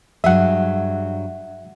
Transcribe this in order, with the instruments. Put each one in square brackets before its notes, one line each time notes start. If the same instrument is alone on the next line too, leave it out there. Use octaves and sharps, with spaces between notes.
[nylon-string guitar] G2 F#3 G#4 [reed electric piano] E5 F#5